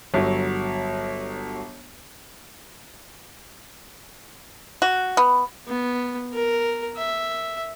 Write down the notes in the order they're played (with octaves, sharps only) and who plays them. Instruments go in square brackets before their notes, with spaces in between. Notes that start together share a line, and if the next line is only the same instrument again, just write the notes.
[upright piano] G1 F#3
[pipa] F#4
B3
[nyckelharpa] B3
A#4
E5